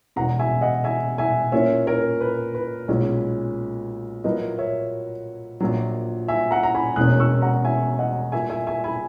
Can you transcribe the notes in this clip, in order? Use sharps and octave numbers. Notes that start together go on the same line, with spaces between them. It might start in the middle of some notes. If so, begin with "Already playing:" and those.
E1 E2 B2 F#5 A#5
E5 G#5
D#5 F#5
E5 G#5
E5 G#5
A#2 A#3 C#4 E4 C#5 E5
A#4 C#5
B4
B4
B1 A#2 G#3 C#4
A#2 F#3 A#3 E4 B4 D#5
C#5 E5
A#1 A#2 F#3
E5 G#5
F#5 A#5
A#5
G#5 B5
E1 E2 B2 A#3 C#4 D#6 F#6
C#6 E6
F#5 A#5
E5 G#5
D#5 F#5
A#2 A#3 E4 E5 G#5
E5 G#5
E5 G#5
G#5 B5